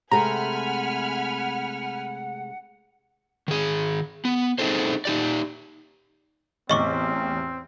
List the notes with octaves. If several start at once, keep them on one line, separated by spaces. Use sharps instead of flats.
C3 G#3 A3 F#5 G#5 A#5 B5 F6
D#3 G#4
B3
C4 D#4 G#4 A4 C5
D#4 G4 D5
A1 E2 C4 D#5 C#6 D6